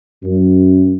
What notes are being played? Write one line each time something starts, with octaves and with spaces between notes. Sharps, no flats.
F#2